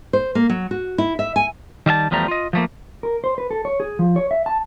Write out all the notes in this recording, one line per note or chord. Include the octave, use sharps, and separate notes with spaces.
C5
A#3
F#3
F#4
E4
E5
G#5
D#3 G3 E5 A5
E2 F3 G3 A3 A#5
F4 D#5
F3 A3 A#3
A#4
C5
B4
A4
C#5
G#4
F3
C#5
E5
A5